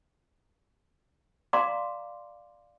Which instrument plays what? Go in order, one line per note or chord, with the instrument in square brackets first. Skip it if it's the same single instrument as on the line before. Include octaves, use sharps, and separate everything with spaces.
[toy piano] D5 F5 A#5 C6 D6